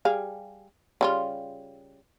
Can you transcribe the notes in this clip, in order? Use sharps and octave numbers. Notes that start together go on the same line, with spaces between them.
G3 G#4 F5
C#3 G3 F4